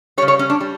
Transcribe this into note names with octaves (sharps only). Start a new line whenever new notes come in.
C#3 G3 C#5
C#5
C#4
D4
G3